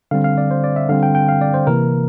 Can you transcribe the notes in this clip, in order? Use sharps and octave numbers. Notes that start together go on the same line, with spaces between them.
D3 G3 C4 F5
F5
D5
C5
D5
E5
D3 G3 C4 F5
G5
G5
F5
D5
C5
C3 E3 A#3 A#4